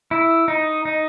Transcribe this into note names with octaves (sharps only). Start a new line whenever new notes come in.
E4
D#4
D#4